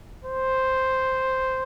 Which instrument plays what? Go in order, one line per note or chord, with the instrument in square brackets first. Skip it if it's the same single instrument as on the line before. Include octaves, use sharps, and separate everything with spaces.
[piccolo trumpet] C5